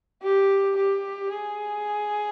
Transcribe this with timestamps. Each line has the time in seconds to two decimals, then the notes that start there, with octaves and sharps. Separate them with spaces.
0.23 G4
0.76 G4
1.30 G#4